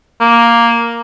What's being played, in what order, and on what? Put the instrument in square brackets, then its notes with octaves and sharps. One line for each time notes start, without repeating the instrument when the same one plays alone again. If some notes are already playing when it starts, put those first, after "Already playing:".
[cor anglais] A#3